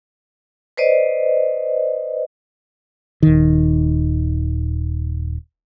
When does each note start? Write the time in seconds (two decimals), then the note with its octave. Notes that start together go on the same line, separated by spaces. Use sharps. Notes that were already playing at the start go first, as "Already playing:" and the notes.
0.77 B4 C5 D5 D#5
3.23 D#1 D#3